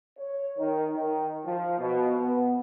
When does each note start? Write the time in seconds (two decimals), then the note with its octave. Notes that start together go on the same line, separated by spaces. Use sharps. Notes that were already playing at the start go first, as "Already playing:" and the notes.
0.18 C#5
0.58 D#3
0.96 D#3
1.45 F3
1.79 B2
2.21 B3